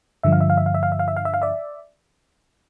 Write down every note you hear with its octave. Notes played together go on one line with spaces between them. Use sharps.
G2 D3 F3 E5
F5
E5
F5
E5
F5
E5
F5
E5
F5
E5
F5
E5
F5
D5 E5